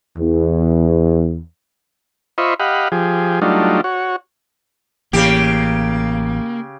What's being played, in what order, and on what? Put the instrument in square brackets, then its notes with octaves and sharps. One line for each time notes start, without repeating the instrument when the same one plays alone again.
[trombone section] E2
[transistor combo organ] F4 C5 D#5 E5 B5 C#6
G4 D#5 F5 F#5 B5
F3 G4 G#4
F#3 G3 A3 D4 D#4 F4
F#4 C#5
[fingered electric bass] A1 E3 [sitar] C#3 G4 [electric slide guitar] A#3